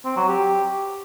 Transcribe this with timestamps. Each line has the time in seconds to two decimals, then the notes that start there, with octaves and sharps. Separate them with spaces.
0.05 C4
0.17 F#3
0.28 G4